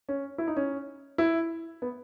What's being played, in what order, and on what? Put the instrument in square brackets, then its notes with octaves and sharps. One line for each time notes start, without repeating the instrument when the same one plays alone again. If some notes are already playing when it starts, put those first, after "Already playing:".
[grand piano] C#4
E4
D#4
C#4
E4
B3